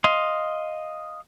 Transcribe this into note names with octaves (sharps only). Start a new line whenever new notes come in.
D#5 F5 C6